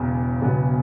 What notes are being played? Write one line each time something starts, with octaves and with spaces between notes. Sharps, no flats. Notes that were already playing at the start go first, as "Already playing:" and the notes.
Already playing: E1 E2 C#3 B3
E1 E2 C#3 F#3 B3